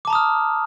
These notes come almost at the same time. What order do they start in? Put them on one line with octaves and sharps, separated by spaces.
D6 A5 A#5 D#6 F6